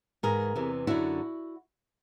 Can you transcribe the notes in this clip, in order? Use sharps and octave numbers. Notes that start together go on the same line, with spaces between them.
G#2 E3 G#4 A#4
E2 C3 E3
F#2 D3 E4 F#4